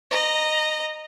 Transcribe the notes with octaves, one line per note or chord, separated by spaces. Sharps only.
D#5 A#5